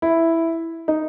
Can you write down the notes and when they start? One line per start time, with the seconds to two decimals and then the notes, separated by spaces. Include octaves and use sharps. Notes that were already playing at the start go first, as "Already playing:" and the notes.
0.02 E4
0.88 D#4